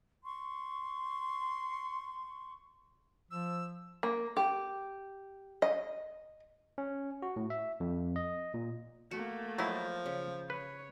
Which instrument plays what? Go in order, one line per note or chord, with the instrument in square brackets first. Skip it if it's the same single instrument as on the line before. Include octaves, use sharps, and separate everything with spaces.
[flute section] C6 C#6
[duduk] F3 [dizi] E6
[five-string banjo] A#3
G4
D#5
[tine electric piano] C#4
F#4
A2
E5
F2
D#5
A#2
[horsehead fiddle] A3 A#3 [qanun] F#4
[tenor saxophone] F3 [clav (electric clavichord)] F#3 E4 [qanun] D#5 C6
[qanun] C#3
[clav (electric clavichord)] B4 [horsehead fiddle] C#5